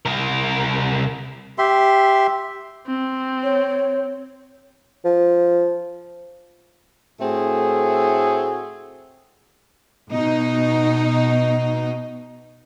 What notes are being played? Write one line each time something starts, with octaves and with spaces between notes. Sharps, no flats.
C2 A#4
G4 E5 C6
C4
C#5
F3
A2 A3 C4 F#4 G#4
B2 D#4